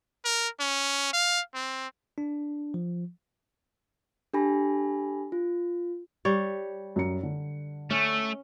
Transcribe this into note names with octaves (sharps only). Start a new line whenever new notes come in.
A#4
C#4
F5
C4
D4
F3
D4 G4 A4 G#5 B5 A#6
F4
G3 C#5
F#2 C#7
D3
A3 C#4